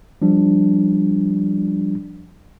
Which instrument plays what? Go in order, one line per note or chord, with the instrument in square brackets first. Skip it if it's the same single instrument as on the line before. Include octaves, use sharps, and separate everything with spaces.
[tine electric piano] F3 G3 D4